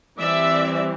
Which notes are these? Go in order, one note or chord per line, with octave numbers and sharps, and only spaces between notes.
E3 G3 C4 D5 E5